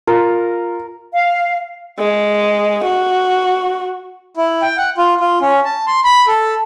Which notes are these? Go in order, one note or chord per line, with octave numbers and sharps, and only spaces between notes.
F4 A#4
F5
G#3
F#4
E4
G5
F#5
F4
F4
C#4
A5
C6
B5
A4